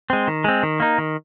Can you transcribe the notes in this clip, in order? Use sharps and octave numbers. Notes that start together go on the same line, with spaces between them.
G#3 C4
D#3
G#3 C4
D#3
A#3 D#4
D#3